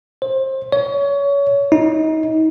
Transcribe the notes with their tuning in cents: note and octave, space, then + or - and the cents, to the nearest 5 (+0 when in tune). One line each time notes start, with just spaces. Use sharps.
C5 +25
C#5 +25
D#4 +30